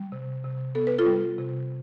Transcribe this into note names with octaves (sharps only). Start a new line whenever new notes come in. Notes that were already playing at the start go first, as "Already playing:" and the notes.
Already playing: G3
C3
C3
B3 A4
B4
F4 A4
G3
C3